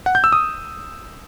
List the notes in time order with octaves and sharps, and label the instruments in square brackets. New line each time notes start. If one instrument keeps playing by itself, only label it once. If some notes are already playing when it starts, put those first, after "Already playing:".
[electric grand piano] F#5
G6
E6
D#6